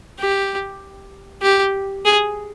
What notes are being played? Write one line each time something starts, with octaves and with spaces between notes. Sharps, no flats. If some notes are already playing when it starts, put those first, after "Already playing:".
G4
G4
G#4